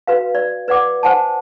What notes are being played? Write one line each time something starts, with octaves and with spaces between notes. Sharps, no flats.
F#4 B4 F5
D5
B4 D5 F#5 D6
C5 F#5 G#5 A5